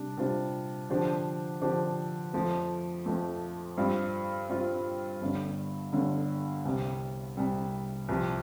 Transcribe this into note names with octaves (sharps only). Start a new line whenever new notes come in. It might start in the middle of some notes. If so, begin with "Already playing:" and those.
Already playing: C3 G3 D4
C3 G3 D4 F4 C5
D3 F3 D4 G4 C5
D3 F3 D4 G4 C5
F2 F3 A3
F2 F3 A3
G2 G3 C4 F4
G2 G3 C4 F4
G1 G2 D3
G1 G2 D3
C2 C3 G3
C2 C3 G3
C2 C3 F3